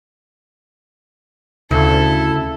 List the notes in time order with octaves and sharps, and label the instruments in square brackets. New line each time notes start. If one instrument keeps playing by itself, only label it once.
[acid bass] D2 [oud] C#3 [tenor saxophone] E4 [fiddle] A4